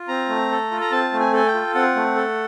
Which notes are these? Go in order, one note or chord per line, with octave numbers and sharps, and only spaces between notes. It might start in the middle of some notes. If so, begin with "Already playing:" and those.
Already playing: F4
C4 A#5
A3
A4
F4
A#5
C4 A5
A3
G#5
A4 G#5
G5
F4
C4 F#5
A3
A4